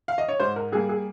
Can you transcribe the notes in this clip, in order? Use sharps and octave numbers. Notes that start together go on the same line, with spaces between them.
F5
D#5
C#5
G#2 C5
A#4
G3 A#3 G#4
G#4